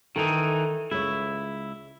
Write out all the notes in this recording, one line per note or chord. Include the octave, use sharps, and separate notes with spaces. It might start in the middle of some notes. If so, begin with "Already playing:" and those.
D#3 E3 D#4 A4
C#2 E4 G#4 C#5